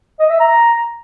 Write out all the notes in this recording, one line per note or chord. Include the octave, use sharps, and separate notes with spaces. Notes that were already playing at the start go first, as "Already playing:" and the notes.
D#5
E5
A#5